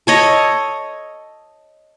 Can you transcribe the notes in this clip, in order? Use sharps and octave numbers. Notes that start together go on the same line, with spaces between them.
A4 C#5 D#5